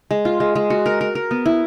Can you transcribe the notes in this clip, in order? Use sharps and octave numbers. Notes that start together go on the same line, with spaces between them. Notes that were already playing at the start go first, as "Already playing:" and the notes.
G#3
F4
G#3
G#3
F#4
A#4
A#4
A#4
B3
E4